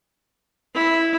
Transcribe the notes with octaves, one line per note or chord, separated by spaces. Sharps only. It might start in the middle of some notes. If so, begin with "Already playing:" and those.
E4